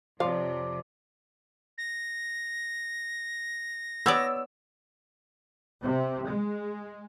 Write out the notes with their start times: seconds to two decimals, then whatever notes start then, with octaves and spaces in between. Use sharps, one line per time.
0.20 F2 C3 F3 D5 F5
1.78 A#6
4.06 B3 C#5 D5 E6
5.83 C3
6.29 G#3